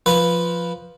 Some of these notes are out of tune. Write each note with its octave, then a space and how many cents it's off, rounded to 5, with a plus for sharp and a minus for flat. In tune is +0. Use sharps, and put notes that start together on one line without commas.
F3 +0 B4 +0